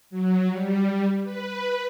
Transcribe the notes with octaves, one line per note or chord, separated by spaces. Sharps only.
F#3
G3
B4